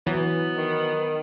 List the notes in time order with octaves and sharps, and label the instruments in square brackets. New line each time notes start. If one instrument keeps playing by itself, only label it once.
[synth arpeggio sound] E3 [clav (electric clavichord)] F#3 [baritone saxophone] B3
[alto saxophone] D#3